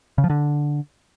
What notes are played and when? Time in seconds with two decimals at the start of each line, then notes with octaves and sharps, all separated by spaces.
0.18 C#3
0.24 F3
0.30 D3